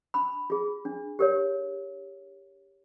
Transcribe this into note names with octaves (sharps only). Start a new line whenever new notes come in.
D4 B5
F4 G#4
D4
G4 A#4 C#5